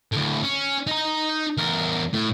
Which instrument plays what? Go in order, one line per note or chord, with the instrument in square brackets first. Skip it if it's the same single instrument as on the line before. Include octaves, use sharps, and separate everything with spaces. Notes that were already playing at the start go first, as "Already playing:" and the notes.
[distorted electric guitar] D2 A2
C#4
D#4 A#5
E2 A#4
A2